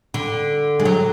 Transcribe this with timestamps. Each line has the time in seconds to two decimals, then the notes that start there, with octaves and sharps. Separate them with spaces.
0.14 D3
0.80 G#3
0.85 F#3